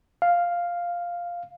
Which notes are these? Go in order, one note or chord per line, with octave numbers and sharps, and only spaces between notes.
F5